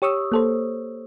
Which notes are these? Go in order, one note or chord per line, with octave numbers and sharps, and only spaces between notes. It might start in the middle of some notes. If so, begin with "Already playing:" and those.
G4 C#5 C#6 D#6 E6
A#3 A4 C5